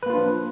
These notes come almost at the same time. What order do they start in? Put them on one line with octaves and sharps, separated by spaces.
B4 A#3 F4 D4 F3